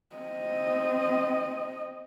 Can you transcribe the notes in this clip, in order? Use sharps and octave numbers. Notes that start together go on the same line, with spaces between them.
C4 D#5